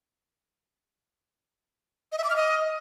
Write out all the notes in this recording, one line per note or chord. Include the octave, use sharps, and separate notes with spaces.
D#5
E5
D6
F6
D#5